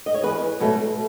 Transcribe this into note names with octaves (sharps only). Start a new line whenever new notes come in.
D#5
C#5
E2 G#4 B4
B2 F#3 A3